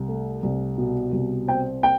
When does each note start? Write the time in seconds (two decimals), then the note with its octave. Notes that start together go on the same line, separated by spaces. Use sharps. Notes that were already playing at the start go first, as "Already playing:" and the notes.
Already playing: C2
0.08 A3
0.43 C2
0.78 B2
1.12 C2
1.48 C4 G5
1.83 G5